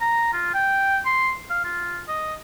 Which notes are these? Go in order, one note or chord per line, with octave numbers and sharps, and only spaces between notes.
A#5
F4
G5
C6
F5
F4
D#5